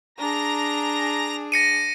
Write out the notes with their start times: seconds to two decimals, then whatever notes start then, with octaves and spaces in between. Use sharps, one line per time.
0.18 D4 G#4 A#5 A#6
1.52 A#6 C#7 D#7